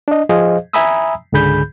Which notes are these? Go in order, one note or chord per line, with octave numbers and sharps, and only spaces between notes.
D4 D#5
F3 G#4 C5 D#5 F5
E5 G#5 A#5 B5 D#6 E6
C#2 G#2 D3 G#4 B5 G6